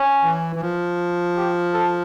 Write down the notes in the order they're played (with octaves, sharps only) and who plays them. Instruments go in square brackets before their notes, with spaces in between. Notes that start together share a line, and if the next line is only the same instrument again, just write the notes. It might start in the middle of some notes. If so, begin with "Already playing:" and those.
Already playing: [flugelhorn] C#4
[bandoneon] E3
E3
F3
[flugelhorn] G4
A4